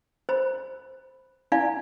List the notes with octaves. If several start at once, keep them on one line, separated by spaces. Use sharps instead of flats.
C5 B5
E4 D5 F5 G#5 B5